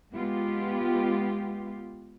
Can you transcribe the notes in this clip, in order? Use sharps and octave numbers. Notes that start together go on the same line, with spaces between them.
G#3 B3 F4 G4